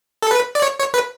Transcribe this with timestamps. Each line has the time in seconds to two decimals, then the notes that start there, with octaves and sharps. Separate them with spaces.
0.22 A4
0.31 B4
0.55 D5
0.62 C#5
0.79 C#5
0.94 B4